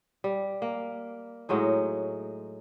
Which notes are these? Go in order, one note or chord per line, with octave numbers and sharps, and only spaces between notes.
G3
A#3
A2 F#3 G#3 D#4